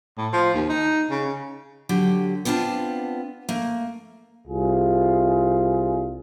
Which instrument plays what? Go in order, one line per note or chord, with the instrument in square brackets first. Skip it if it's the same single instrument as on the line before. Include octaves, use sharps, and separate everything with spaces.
[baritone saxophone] A2
F3
D#2
D#4
C#3
[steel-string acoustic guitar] D3 F#3 G4
B3 C4 D4 F4 A5
A3 A#3
[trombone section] C2 F4 G#4